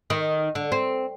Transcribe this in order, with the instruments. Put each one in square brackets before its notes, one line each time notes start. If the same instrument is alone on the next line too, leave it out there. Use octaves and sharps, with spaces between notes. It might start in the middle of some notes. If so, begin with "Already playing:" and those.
[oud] D#3
D3
C4